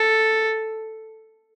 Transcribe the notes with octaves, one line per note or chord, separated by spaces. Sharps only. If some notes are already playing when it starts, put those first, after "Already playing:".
Already playing: A4